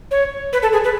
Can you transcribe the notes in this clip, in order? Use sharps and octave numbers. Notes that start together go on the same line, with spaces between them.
C#5
B4
A4
G#4
B4